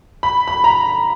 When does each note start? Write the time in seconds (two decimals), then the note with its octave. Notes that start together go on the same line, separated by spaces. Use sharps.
0.23 B5
0.48 B5
0.64 A#5